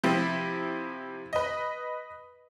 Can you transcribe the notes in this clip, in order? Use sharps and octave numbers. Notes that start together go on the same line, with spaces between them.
C3 F3 C4 E4
B4 D#5